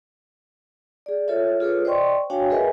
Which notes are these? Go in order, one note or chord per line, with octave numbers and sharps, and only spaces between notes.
G#4 D5
F4 A4 C#5 E5
F4 G#4 A4 B4 C#5
C5 D5 D#5 G5 C6 C#6
D4 F#4 C#5 F5 G5 G#5
G#4 A#4 B4 D#5 E5 G#5